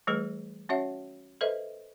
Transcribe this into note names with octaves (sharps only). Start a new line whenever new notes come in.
E3 G3 A3 G#4 B4
C#4 F#4 C#5 E5 F#5
A4 B4 C5 D#5 E5